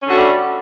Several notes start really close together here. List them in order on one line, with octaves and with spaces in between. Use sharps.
C#4 D3 F#4 A3 G3